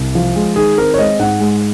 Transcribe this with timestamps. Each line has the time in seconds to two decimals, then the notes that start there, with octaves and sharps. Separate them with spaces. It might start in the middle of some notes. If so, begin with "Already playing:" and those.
Already playing: C2
0.15 F3
0.36 G#3
0.56 D#3 G#4
0.78 C4 A#4
0.94 C#5
0.98 G#3 D#5
1.19 G#2 F#5
1.40 G#3